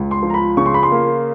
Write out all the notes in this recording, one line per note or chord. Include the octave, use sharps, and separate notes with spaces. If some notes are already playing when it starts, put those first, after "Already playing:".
Already playing: C#2
C6
F3
A#5
B5
C#3 C#6
C6
B5
C6
A#3